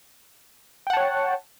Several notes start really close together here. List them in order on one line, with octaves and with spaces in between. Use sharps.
G5 F#5 A5 C#5